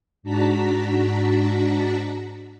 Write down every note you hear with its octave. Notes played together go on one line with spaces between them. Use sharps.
G#2 D4 F#4 A5 A#5 B6